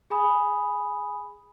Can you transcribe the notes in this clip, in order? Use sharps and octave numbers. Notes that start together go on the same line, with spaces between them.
G#4 G#5 B5 D#6